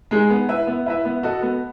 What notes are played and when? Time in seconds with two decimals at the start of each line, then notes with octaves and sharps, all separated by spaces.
0.11 G#3 D#4 G#4
0.30 B3
0.49 E4 B4 E5
0.67 B3
0.86 E4 B4 E5
1.05 B3
1.23 F#4 A4 D#5
1.42 B3